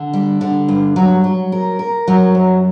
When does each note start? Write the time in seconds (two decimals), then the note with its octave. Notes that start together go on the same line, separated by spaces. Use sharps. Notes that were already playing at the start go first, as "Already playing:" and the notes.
Already playing: D3
0.13 G3
0.41 D3
0.68 G2
0.96 F#3
1.24 F#3
1.52 A#4
1.79 A#4
2.08 F#3
2.35 F#2